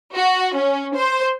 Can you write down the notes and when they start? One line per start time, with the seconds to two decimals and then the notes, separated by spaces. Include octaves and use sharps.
0.15 F#4
0.55 C#4
0.95 C5